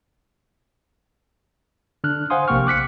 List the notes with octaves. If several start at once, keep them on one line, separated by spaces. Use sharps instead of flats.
D3 D4 F6 F#6
C5 F5 F#5 G#5 C6 D#6
A#1 C3 A#3 G5 C#6 F6
D6 F#6 B6 C#7